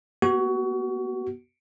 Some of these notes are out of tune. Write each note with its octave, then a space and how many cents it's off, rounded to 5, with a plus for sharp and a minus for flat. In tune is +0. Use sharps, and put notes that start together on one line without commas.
B3 -25 F#4 +25